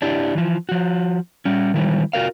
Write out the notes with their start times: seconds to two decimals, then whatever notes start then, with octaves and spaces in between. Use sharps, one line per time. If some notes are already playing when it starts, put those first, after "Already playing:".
0.02 D4 E4 G4
0.35 E3 F3
0.69 F3 F#4
1.45 G3 C#4
1.74 D#3 E3 G3
2.13 F4 F#4 A4 A#4 F5